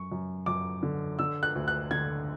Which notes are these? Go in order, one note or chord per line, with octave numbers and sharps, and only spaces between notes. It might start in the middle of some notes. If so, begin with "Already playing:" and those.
Already playing: F#2 C#6
F#2
F#2 D6
D3
D3 E6
F#6
D2
F#6
D3 G#6